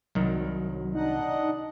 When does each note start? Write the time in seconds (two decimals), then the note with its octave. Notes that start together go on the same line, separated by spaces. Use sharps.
0.15 C2 D#3 F#3
0.95 D4 D#4 D#5 F#5